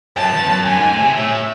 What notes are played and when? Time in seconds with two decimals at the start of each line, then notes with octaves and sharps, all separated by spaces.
0.16 F#2 A5
0.33 E2
0.49 F#2
0.66 F#2 G#5
0.78 G#2
0.91 A2
1.02 C3
1.15 A2 E5